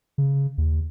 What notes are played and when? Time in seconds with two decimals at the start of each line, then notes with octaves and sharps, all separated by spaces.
0.18 C#3
0.58 D#2